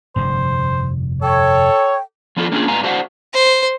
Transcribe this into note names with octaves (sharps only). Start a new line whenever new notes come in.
F1 G2 D3 C5
A4 C#5 G5
F3 B3 D4 F4 A4
A#3 C#4 D4 F4 G4 G#4
G#2 B3 F5 G#5 A#5
D4 F#4 C5 F5 F#5
C5